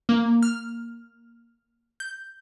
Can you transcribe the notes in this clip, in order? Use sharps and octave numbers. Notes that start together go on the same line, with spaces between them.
A#3
F6
G6